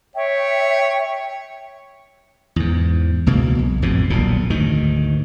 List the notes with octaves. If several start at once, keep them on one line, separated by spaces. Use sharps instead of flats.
C#5 E5 G5
E2 G#2
C#2 B2 A#3
B1
A1 F2 G#2 B2
D#1 B1 F2 A#2
D2 G#2 D#3